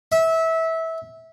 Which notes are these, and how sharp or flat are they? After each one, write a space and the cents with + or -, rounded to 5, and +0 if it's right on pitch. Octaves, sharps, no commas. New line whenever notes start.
E5 -20